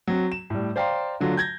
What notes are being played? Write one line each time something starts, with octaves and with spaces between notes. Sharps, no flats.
F#3 C4
E7
A2 G3
C5 D5 F5 G5 A#5 C6
D3 F#3 A3 D4 F4
G6 G#6 A#6